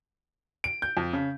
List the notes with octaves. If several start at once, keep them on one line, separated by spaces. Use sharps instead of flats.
D7
G6
F2
C#3